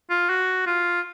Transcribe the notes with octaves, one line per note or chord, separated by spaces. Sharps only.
F4
F#4
F4